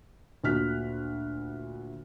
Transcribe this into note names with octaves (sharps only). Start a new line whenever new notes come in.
D2 A#2 F#4 F6 F#6 B6